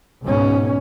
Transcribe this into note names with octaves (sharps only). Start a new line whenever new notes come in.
C#2 G#2 B2 C#4